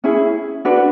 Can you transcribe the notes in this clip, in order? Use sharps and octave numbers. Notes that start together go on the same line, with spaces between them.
C#4 E4 G#4
D4 F#4 B4